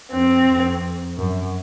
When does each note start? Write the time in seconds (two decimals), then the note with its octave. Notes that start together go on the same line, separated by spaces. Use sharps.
0.12 F2 C4
0.47 F2
1.17 F#2